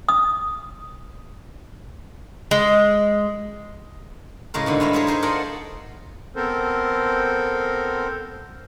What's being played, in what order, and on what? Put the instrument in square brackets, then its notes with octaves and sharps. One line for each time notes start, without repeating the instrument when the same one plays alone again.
[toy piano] D#6
[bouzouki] G#3
[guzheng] A2 C#3 G#3 A#4
G#2 B2 D3
G2 G#3 E4 F5
G#4 A#4 C5 C#5 E5
D#4 G#4 C5 E5
F4 A4 A#4 D5 D#5 F#5
[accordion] B3 C4 A4 A#4 C5